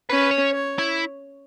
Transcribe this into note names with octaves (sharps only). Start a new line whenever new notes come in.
C#4 B4
C#5
C#5
E4